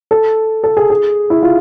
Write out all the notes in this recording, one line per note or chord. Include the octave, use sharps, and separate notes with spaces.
A4
A4
G#4
G#4
E4
F4